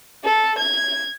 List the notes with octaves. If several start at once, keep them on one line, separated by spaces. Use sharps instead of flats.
A4
G#6